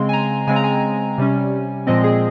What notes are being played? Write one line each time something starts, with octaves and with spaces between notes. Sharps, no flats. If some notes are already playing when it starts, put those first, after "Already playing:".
Already playing: C#3 G#3 C4 C6
G#5
A#5
C#3 G#3 C4 G#5
A#5
G#5
C3 G3 C#4
A#2 F3 G#3 C4 D#5
G#4